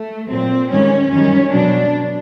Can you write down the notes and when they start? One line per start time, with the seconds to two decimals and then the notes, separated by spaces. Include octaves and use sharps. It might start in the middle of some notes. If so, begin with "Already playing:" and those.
Already playing: A3
0.29 A#2 F#3 C4
0.70 G#2 D#3 G3 C#4
1.11 F#2 D#3 G3 C#4
1.52 B2 F#3 D4